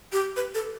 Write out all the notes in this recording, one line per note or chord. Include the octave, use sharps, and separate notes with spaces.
G4
B4
A4